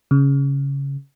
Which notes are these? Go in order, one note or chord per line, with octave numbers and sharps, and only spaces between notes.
C#3